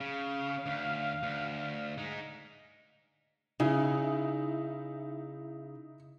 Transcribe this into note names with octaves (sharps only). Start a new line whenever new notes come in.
C#3 F5
D2
D2
G#3 D#4
C#3 D#4 E4